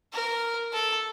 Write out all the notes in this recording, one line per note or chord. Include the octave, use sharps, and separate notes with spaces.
A#4
A4